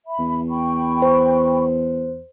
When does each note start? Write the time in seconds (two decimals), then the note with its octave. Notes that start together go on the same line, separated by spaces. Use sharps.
0.07 E5 B5
0.19 E2
0.50 G5 B5 C#6
1.02 C5